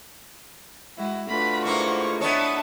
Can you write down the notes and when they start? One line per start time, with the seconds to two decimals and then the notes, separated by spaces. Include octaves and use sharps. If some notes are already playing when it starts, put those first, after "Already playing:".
0.96 G#3 E4 F#4
1.29 A3 D4 F4 F#4 B4 B5
1.65 G#2 A#3 E4 C#6
2.21 B3 D4 C#5 D#5 E5 A5 B5 D#6